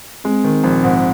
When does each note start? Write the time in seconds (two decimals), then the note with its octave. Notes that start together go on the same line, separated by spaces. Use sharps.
0.25 G#3 C4
0.44 D#3
0.64 A#1
0.83 G#2